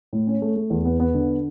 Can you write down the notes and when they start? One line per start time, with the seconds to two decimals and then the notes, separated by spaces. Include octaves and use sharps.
0.13 A2
0.27 C#4
0.42 A3
0.56 A3
0.70 E2
0.85 B3
1.00 B3
1.14 D3